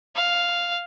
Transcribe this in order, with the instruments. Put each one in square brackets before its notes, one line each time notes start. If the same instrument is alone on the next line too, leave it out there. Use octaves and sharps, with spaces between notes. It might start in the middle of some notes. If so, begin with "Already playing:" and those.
[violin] F5